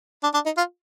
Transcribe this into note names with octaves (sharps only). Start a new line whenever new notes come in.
D4
D4
D#4
F4